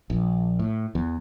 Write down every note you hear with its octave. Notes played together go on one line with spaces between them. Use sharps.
A#1
A2
E2